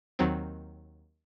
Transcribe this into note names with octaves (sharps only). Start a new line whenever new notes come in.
D#2 D#3 F#3 C4